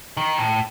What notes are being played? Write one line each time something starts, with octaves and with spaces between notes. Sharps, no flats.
D#3
A2